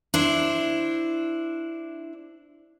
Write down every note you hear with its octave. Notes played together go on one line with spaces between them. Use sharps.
D4 E4 C5